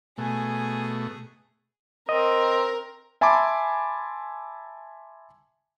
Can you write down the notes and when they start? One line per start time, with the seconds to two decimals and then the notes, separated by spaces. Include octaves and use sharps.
0.18 B2 A3 G#4 G#5
2.09 C4 A#4 D#5
3.21 E5 G#5 A5 B5 C6 D6